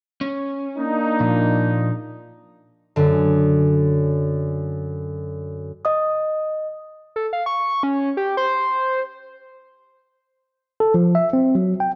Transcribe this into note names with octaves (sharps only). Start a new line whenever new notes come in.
C#4
A#3 D4 D#4
A#2 F3
F#2 D3
D#5 D#6
A4
F5
C#6
C#4
G4
C5
A4
F3
E5
C4
F#3
G5